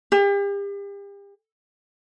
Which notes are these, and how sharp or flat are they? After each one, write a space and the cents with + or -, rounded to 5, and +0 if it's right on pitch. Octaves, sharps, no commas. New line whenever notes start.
G4 +40